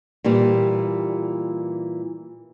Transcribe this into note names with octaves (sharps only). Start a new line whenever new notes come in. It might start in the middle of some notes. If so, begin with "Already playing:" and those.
A#2 E3 G3